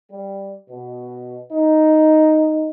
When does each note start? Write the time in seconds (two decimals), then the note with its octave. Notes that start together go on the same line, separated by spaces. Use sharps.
0.11 G3
0.70 B2
1.52 D#4